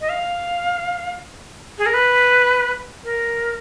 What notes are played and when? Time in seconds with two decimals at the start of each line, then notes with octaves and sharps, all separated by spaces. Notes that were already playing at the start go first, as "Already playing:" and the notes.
0.01 D#5
0.09 F5
1.78 G#4
1.86 A#4
1.94 B4
3.05 A#4